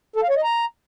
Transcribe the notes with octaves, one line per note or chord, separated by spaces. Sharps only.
A4
F5
C#5
D#5
A#5